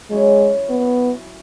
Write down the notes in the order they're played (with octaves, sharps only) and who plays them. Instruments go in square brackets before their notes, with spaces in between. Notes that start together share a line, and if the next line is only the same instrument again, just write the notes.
[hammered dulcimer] F#3 C#4 E4 [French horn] G#3
[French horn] B3